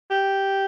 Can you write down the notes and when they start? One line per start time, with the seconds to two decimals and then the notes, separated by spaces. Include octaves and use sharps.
0.10 G4